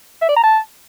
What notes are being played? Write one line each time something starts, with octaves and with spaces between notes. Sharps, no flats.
E5
D5
A#5
A5